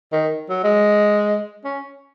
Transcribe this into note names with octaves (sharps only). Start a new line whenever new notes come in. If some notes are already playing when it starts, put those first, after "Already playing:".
D#3
F#3
G#3
C#4